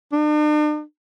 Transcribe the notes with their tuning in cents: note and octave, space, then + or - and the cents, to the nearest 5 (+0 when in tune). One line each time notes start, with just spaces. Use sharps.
D4 +45